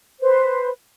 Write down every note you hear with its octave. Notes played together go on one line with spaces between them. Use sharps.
B4 C5